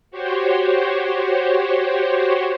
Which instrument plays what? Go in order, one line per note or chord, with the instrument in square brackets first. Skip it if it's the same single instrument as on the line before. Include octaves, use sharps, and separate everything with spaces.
[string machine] F#4 G4 C5 C#5